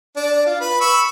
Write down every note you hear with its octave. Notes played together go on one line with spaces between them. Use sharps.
D4 D5
F4
B4 B5
B5 C#6 E6